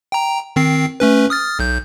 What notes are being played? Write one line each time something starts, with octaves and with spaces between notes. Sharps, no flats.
G5 A#5
D#3 C4 C7
A3 C#4 B4
D#6 F6 A6
B1 G6